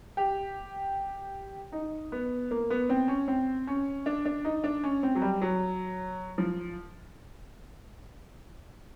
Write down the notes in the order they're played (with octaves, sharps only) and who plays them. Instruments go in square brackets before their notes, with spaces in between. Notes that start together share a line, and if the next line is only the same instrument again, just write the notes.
[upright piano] G4
D#4
B3
A#3
B3
C4
C#4
C4
C#4
D4
D4
D#4
D4
C#4
C4
F#3
G3
F#3
F3